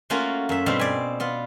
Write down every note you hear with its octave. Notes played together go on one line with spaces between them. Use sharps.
A3 A#3 C#4 F4 F#4
F#2 E5
G2 B2 G3 C4 F5
D5 G#5
B3 F4